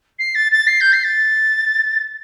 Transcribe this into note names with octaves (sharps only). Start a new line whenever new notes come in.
C7
A6
A6
C7
G6
C7
A6